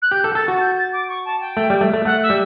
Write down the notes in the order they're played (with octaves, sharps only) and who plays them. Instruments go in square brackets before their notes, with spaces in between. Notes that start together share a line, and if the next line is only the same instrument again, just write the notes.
[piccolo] F#6
[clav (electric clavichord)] G4 [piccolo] G6
[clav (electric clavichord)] A4
[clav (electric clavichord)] A4 [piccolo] A6
[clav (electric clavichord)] F#4
[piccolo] G6
A6
D6
C#6
A5
G5
[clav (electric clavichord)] A3
G3
A3
A3
[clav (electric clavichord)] A3 [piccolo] F#5
[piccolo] E5
[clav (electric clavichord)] G3